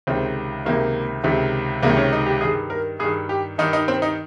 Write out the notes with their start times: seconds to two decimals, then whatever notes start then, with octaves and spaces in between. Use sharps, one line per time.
0.07 C#2 C3 D#3 C4
0.65 C#2 C3 D#3 A#3
1.24 C#2 C3 D#3
1.83 C#2 C3 D#3 A#3
1.97 C#4
2.12 D#4
2.26 G4
2.41 G2 D#3 G#4
2.70 A#4
3.00 G2 G#4
3.04 D#3
3.29 G4
3.58 G2 D#3 D#4
3.73 D#4
3.88 C4
4.02 D#4